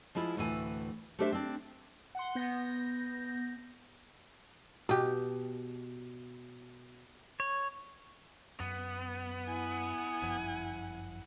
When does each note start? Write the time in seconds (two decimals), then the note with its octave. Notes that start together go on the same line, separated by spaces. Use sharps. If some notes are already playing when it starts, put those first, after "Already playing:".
0.15 F3 G#3 E4 F4
0.37 D2 A2 E3 G#5
1.19 A3 D4 G4 C5 E5
1.32 C4 D4
2.15 F#5 C6
2.35 B3 G6 A#6
4.89 B2 G4
7.40 C#5
8.60 F#2 B3
9.47 E4 F#5 G#5
10.22 G1 F#2 F3